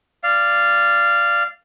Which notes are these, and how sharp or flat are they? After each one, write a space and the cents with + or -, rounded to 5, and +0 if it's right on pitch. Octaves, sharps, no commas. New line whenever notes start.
D5 +0 F5 -15